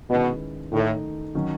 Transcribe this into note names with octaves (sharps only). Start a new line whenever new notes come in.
B2 D#3 G#3 C#4 E4 B4
A2 D#3 A3 D#4
D#3 F#3 C#4